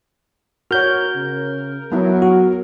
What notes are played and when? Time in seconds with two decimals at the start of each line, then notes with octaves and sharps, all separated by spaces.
0.71 F#4 A#4 C#5 F6 G6
1.15 C#3
1.92 F#3 B3 E4
2.22 F#4